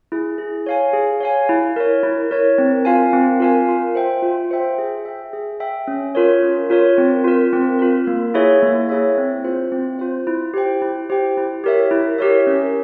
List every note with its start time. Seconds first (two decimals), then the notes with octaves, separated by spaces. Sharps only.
0.12 E4 G#4
0.38 G#4
0.66 C#5 F5 G#5
0.93 G#4
1.20 C#5 F5 G#5
1.49 E4
1.76 A#4 C#5
2.03 E4
2.31 A#4 C#5
2.58 C4
2.85 F4 A#4 F5 G#5
3.13 C4
3.40 F4 A#4 F5 G#5
3.69 F4
3.95 C5 E5 G5
4.22 F4
4.51 C5 E5 G5
4.78 G#4
5.05 E5 G5
5.33 G#4
5.60 E5 G5
5.88 C#4
6.15 F4 A#4 C#5
6.43 C#4
6.70 F4 A#4 C#5
6.98 C4
7.24 F4 A#4
7.53 C4
7.79 F4 A#4
8.07 A#3
8.34 E4 G#4 C#5 E5
8.62 A#3
8.89 E4 G#4 C#5 E5
9.18 C4
9.44 F4 C5
9.72 C4
9.99 F4 C5
10.27 E4
10.54 G4 C5 G5
10.82 E4
11.10 G4 C5 G5
11.37 E4
11.64 G4 A#4 C#5 E5
11.91 E4
12.18 G4 A#4 C#5 E5
12.47 C#4